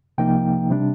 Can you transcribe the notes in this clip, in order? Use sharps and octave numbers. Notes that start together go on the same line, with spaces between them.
C2 C3 F3 A#3 D#4 G5
C3 G3 D4